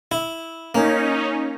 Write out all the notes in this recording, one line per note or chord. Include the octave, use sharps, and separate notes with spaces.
E4
A#3 C#4 D#4